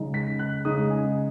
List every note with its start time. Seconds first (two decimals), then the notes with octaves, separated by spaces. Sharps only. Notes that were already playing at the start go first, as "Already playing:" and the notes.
Already playing: C#3 G#3 D#4
0.14 B6
0.39 F#6
0.65 C#3 G#3 D#4 D#6
0.90 G#5